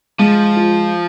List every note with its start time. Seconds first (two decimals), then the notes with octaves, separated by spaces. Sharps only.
0.19 F3 G#3
0.56 F4